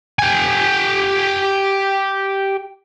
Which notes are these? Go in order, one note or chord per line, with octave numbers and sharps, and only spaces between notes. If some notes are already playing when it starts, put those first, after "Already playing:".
G4 G#5